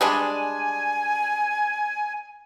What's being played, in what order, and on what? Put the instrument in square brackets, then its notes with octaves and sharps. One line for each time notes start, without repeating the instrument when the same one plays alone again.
[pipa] G3 G#3 D4 [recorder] G#5